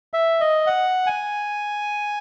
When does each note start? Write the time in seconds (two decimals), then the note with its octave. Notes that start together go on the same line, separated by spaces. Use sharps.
0.14 E5
0.41 D#5
0.67 F#5
1.07 G#5